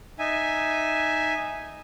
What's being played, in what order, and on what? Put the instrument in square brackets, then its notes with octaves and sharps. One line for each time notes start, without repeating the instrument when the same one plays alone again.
[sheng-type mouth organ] D#4 E5 G#5